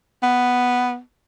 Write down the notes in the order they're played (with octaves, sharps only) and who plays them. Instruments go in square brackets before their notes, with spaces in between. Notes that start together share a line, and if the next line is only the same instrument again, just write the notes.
[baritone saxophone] B3